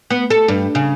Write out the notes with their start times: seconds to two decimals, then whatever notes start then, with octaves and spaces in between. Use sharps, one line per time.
0.10 B3
0.30 A4
0.48 G2
0.75 C#3